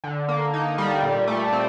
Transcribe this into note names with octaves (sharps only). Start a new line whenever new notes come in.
D3
A#3
D#4
G3
A#2
A3
C4